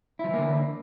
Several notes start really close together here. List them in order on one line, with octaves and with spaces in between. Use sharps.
E4 F3 E3 A#3 D3